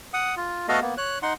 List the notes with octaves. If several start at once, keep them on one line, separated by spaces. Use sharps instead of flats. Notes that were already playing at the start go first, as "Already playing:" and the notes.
F#5 D#6
F4
A3 B3 F#4 A4 D#5 F5
A#3 B3
C#5 F#6
D#4 F#5 C6